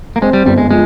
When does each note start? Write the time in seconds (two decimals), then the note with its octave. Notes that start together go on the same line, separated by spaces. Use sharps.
0.16 A#3
0.21 G#3 C4
0.33 G3
0.46 G1 G3
0.58 G#3
0.70 F3 G#3